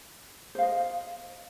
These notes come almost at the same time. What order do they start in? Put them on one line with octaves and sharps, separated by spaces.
C5 F5 D#5